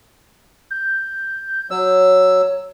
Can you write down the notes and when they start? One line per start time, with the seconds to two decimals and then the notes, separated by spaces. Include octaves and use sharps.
0.71 G6
1.71 F#3 C#5 E6